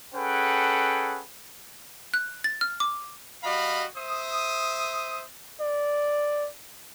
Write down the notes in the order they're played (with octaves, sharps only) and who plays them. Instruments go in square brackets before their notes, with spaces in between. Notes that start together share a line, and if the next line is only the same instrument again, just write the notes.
[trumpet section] C#4 G#4 A4 B4 F#5 G5
[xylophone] F#6
A6
F6
D6
[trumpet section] G3 F#4 D#5 F5 B5
C5 E5 D#6
[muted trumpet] D5